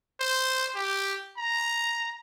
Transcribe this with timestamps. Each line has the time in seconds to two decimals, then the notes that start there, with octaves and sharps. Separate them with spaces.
0.20 C5
0.75 G4
1.37 A#5